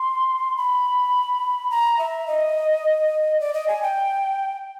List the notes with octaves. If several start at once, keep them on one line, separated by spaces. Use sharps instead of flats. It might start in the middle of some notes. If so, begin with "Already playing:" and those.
Already playing: C6
B5
A#5
E5
D#5
D5
D#5
G#5
G5